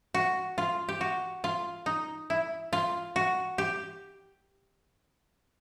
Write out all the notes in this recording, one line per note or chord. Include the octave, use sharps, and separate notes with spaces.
F#4
F4
G4
F#4
F4
D#4
E4
F4
F#4
G4